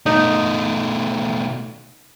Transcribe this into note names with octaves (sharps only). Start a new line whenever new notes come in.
B2 A3 D#4